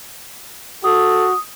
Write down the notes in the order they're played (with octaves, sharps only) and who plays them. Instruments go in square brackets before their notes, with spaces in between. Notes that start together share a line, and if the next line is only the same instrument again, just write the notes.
[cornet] F#4 [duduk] A4 [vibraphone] D#6